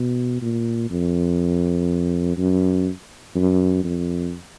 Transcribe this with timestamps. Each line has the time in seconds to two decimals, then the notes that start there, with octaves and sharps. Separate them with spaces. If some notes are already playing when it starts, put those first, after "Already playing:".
Already playing: B2
0.42 A#2
0.90 F2
2.38 F#2
3.35 F#2
3.84 F2